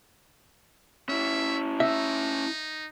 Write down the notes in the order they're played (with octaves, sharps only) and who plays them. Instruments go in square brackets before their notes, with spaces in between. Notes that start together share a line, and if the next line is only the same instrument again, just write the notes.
[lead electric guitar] C#4 E4 [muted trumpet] E5
[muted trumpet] D#4 [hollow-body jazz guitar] E5